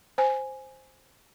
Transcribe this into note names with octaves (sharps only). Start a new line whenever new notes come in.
C5 G#5